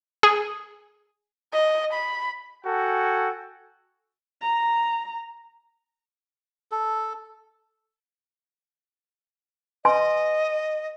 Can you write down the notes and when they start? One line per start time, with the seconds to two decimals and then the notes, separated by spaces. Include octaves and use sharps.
0.23 G#4
1.53 D#5
1.93 B5
2.65 F#4 A4 G5 G#5
4.41 A#5
6.71 A4
9.85 B4 D#5 G#5 C6